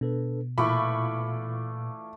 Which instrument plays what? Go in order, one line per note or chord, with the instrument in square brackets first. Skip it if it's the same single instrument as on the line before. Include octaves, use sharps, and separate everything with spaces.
[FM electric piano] B2 [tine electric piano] D4 A4 B4
[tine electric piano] A#2 [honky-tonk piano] E3 F4 B5 [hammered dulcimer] A3 D5 C#6